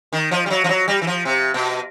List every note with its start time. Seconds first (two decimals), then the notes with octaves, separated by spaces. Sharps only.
0.13 D#3
0.31 F3
0.46 G3
0.50 F#3
0.64 F3
0.69 F#3
0.88 G3
1.02 E3
1.07 F3
1.25 C3
1.54 B2